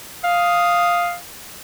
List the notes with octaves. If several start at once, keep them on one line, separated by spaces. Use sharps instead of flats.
F5 D#6